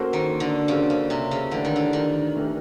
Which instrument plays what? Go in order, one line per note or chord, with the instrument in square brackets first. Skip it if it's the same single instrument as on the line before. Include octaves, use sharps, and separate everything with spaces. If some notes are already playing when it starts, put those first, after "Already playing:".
Already playing: [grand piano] A#3 C#4 F#4 A4 C5
[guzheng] D#3
D3
[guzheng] C#3 [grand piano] A#3 C#4 F#4 A4 C5
[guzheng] C#3
C3
C#3
[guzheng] D3 [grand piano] E3 A3 D4 G4 B4
[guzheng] D#3
D3
D#3
[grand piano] E3 A3 D4 G4 B4